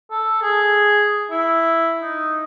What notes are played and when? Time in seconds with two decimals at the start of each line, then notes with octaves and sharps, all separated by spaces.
0.11 A4
0.42 G#4
1.31 E4
2.02 D#4